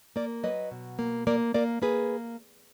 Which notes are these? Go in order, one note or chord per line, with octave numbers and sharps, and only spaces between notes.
A#3 A#4 D5
F#3 B4 D#5
B2
A#3
A#3 A#4 D5
A#3 A#4 D5
A#3 G#4 B4